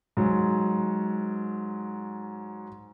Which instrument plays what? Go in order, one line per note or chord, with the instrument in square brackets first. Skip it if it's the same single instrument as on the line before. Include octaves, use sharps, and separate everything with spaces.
[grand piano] G#2 F#3